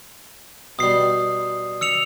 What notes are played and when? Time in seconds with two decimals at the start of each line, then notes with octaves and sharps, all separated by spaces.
0.79 B2 G3 D#6 C7
1.81 E6 C#7 F7